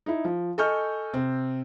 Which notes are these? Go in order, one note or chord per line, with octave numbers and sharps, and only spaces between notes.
D#4 E4
F3
A4 D#5 G#5 C#6 F6 G6
C3 C4